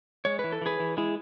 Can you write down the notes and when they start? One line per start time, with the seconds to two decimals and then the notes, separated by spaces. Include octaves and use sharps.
0.25 G#3 C#5
0.39 E3 B4
0.52 A4
0.62 E3 G#4 B4
0.80 E3
0.97 G#3 E4 G#4